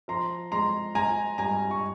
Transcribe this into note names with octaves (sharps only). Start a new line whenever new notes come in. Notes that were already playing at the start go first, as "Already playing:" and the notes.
F3 A#5 C6
G#3 A#5 C6
G#3 G#5 A#5
G2 G#5 A#5
C#6